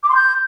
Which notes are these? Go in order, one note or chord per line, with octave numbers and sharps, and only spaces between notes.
D6
C6
G6